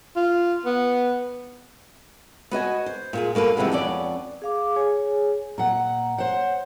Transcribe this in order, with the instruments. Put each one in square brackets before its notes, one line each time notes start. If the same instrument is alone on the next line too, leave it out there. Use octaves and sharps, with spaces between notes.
[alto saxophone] F4
B3
[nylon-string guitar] B3 F#4 D#5 G#5
C5
A#2 F4 G#4
B2 A#3 A4 B4
C3 E3 F3 G3 G#3 B3
F2 B3 C#4 D5
[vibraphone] G#4 F5 D6
G#4 C#5 G#5
[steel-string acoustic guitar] A#2 F#5 [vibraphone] A#5
[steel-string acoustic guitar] C5 F#5 [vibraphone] C#5